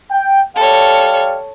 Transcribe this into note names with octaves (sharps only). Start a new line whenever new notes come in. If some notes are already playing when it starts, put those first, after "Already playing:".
G5
G3 A4 C#5 F5